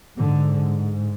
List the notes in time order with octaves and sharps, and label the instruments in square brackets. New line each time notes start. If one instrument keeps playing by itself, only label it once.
[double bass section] G#2 D3